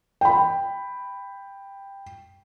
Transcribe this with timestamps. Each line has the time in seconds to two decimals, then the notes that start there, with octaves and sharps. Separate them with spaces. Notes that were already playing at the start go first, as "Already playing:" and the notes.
0.21 G5 B5